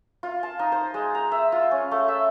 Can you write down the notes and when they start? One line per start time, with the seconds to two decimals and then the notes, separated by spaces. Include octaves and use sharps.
0.23 F4
0.43 A5
0.59 D#4
0.72 C5
0.94 G#3
1.15 A#5
1.32 E5
1.52 F4
1.71 C#4
1.91 A3
2.08 E5